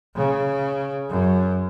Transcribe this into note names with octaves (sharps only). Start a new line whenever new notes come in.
C#3
F#2